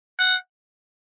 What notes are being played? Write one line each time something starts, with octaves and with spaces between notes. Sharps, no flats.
F#5